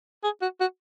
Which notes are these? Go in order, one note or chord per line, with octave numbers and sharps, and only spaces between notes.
G#4
F#4
F#4